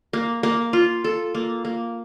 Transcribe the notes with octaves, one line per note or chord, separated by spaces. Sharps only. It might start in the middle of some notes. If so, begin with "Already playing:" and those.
A#3
A#3
F4
A4
A#3
A#3